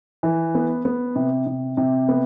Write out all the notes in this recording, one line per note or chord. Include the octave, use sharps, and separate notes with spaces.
E3
B3
B3
C3
C3
C3
B3